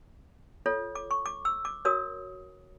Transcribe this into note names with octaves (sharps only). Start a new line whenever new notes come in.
F4 A4 C#5
D6
C#6
D6
E6
D6
F#4 A#4 C#5 D#6